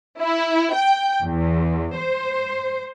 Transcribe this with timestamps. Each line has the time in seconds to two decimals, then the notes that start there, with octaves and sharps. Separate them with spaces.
0.20 E4
0.73 G5
1.24 E2
1.98 C5